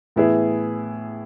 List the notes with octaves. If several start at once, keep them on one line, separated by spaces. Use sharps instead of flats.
A2 E3 B3 E4 G#4